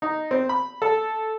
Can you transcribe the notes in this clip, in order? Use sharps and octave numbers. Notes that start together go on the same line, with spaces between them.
D#4
C4
B5
A4